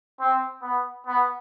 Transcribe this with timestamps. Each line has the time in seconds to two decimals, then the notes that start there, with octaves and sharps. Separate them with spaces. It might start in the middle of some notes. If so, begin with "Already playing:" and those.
0.20 C4
0.62 B3
1.07 B3